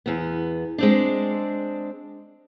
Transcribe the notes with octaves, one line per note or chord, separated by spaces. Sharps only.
E2 B3
G#3 C4 D4